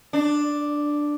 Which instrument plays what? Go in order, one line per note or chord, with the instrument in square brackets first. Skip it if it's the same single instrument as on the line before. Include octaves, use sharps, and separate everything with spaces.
[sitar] D4